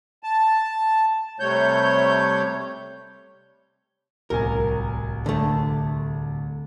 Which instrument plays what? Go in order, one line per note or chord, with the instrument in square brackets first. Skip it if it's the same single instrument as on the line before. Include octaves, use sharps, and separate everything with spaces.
[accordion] A5
C3 G3 A3 C#5 G6
[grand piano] D1 C2 G#5 [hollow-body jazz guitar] A#4
[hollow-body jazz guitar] D3 A3